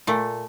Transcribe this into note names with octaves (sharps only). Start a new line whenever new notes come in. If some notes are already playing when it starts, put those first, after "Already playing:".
A#2 A3